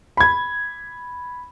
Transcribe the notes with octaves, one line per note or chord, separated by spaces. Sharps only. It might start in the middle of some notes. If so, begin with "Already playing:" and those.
B5 G#6